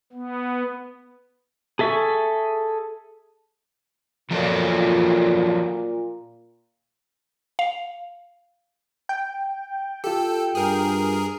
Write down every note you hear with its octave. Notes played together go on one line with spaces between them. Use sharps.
B3
G#4 A4 E5 C#6
A#2 F3 F#3 A4
F5
G5
F4 G4 A4
G2 G#4 A#4